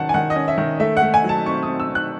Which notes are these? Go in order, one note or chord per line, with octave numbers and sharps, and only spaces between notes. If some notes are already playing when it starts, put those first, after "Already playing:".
Already playing: D#3 F#3 C#4 F#5 A5
G#5
D#3 F#5
D#5
C#4
E5
D#3
A3 E5
F#5
A3
G#5
F#3 A5
C4 C#6
D#6
C4
E6
C4
F#6